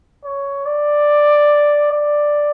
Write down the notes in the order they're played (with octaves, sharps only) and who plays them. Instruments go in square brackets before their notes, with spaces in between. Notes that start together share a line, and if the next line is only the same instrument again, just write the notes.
[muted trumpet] C#5
D5
D5